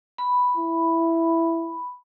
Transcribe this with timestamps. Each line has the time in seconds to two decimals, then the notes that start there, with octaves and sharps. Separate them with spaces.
0.18 B5
0.57 E4